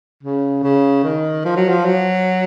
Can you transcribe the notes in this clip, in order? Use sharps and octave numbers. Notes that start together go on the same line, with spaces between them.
C#3
C#3
D#3
F3
F#3
F3
F#3